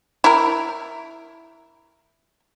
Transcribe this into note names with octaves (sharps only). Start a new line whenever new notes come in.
E4 A#4